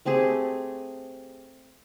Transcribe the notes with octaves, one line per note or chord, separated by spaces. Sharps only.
A3 C4 G4 G#4